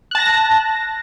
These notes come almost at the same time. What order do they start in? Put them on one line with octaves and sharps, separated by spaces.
F#6 A5 A#6